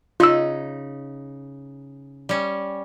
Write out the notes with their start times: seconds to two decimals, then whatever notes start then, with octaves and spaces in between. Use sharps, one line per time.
0.20 C#3 D#4 F4 E6
2.29 G3 C#4